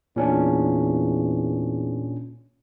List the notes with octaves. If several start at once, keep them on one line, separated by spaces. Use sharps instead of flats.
E2 A#2 C#4 D4